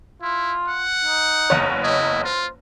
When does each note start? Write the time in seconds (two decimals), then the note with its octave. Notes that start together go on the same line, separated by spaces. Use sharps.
0.22 E4 F4
0.68 F#5
1.05 D#4
1.50 F#1 E2 C#5
1.83 E4 D#5
2.24 F4 C5